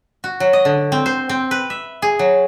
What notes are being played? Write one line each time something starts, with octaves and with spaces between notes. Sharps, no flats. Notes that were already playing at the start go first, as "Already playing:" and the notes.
F#4
F#3
D#5
D3
C4
C5
C4
B4
E5
G#4
F#3